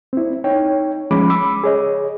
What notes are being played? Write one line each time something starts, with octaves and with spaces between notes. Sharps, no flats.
C4 E4
D#4 C#5 G5
F3 G#3 C#4 B5 D6
B5 D6 E6
G#4 C#5 D#5